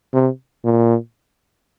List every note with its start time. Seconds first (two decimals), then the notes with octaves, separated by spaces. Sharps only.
0.13 C3
0.64 A#2